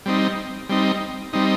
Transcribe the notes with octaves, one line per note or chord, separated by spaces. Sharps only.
G3 C4 D#4
G3 C4 D#4
G3 C4 D#4